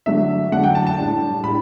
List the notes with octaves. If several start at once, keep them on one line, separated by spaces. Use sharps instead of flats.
D3 F#3 A3 D4 E5
D3 F#3 A3 D4 F#5
G5
A5
A5
A2 G3 D4
A2 G3 D4 B5